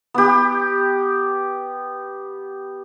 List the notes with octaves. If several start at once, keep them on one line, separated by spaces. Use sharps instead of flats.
B3 G4